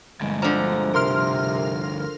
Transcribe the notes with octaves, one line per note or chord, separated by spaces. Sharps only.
D2 G2 G#3
D3 F3 A#5
C3 A#4 C6 F6